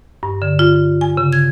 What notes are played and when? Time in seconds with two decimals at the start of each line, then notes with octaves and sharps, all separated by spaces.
0.23 G2
0.42 D3
0.59 F4
1.01 G#5
1.17 C#3
1.33 G#6